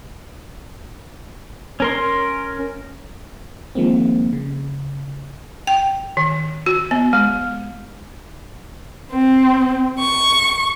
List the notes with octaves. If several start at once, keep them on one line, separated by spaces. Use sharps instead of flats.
C#4 A#4 C6
D#3 F3 G#3 A#3 C4
C#3
G5
D#3
F#4
B3
G#3
C4
C#6